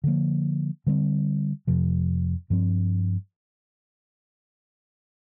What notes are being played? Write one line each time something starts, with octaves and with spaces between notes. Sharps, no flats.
D3 F3 A#3
D3 G3 C4
F2 C3 F3
G2 F3 C4